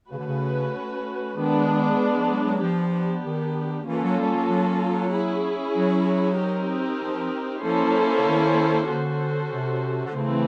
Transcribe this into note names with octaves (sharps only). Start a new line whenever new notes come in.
C#3 A3 C#4 F#4 B4
D3
C#3
D#3 G#3 B3 D4
F3
F#3
F#3
F3 B3 D4 G4
D#3
E3 A#3 C#4 F4 A4
F#3
G3
F#3
F#3
C#4 E4 G#4
F#3
C4 D#4 G4 A#4
F3
F3 A#3 C#4 E4 A4 C5
F#3
D3
D#3
D3 C#4 F#4 A4 C5
C3
D3
C#3 E3 A3 C4